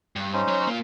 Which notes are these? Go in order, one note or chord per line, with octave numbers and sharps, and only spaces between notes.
G2
C#4 D#4 C5
F#3 C#5
A#3 F4